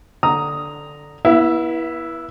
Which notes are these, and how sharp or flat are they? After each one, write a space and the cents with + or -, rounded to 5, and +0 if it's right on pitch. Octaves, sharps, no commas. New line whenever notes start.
D3 +0 A#5 +0 D#6 +5
B3 -30 E4 +0 E5 +30